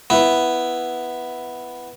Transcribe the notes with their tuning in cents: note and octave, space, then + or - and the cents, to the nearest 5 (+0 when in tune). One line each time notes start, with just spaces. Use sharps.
B3 +0 E4 +0